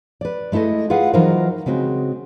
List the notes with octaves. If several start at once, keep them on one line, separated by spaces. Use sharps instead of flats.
B4 D5
G#3 A3 E4 A4 D#5
F4 G#4 B4 F5 F#5
E3 F#3 D#4 F4 A#4 C5
C#3 G#3 C4 F#4